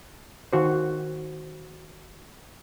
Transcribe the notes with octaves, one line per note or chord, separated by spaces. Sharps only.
D#3 F#4 C5